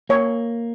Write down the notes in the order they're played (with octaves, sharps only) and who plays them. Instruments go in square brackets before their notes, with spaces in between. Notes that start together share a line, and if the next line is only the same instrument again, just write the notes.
[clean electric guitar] A#3 [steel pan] C#5